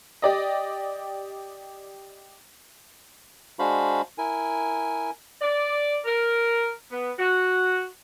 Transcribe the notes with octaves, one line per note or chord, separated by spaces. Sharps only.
G4 D5 D#5
G#3 D4 F#4 C5 F5 B5
E4 A#4 G#5
D5
A#4
B3
F#4